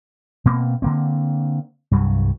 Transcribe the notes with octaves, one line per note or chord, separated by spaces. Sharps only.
B2 A#3 C4
D3 A#3 C4
C2 G2 F#3